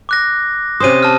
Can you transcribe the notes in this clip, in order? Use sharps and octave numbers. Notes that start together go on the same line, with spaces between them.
D6 F#6 A#6
C3 C#4 C5 D#6 D#7
A5 F6